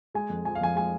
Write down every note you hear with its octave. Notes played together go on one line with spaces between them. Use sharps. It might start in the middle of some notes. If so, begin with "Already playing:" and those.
G#3 G#5
F2
F3 G#5
F5
F2 G#5
G#3 G#5